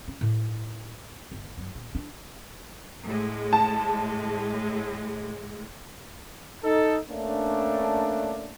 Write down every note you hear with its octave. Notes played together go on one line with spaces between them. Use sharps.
C#4
A2
G1
F#2
A#2
D4
A2 G#3
A5
D#4 A4
A3 A#3 C#4 D4